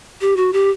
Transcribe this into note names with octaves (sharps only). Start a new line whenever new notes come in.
G4
F#4
G4